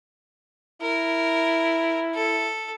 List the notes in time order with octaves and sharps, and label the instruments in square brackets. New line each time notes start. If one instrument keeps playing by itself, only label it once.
[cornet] E4 [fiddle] A#4
[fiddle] A4